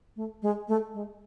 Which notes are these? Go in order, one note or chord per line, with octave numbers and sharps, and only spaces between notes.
A3
G#3
A3
G#3